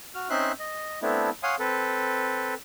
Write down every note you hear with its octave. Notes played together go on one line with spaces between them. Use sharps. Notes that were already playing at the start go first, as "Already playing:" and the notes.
F#4 F6
C4 C#4 D#4 E5 C6 F#6
D#5
A3 B3 C4 D4 E4
C#5 F5 F#5 G#5 C6 D#6
C4 A4 B4